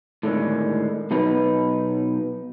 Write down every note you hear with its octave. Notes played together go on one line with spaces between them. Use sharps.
A2 D3 D#3 G#3
B2 F#3 D#4 B4